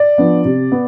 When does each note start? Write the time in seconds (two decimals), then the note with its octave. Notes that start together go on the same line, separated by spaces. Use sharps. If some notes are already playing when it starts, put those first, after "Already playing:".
Already playing: D5
0.18 F3 B3 D4
0.45 C3
0.72 B3